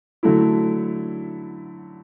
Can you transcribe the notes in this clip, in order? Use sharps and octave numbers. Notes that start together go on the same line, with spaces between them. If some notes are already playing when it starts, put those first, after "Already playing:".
D3 F#3 A3 E4